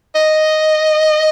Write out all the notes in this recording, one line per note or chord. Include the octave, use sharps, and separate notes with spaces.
D#5